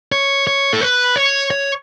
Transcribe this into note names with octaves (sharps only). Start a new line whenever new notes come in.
C#5
C#5
A4
B4
C#5
C#5